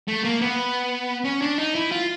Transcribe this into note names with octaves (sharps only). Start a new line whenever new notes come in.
A3
A#3
B3
C#4
D4
D#4
E4
F4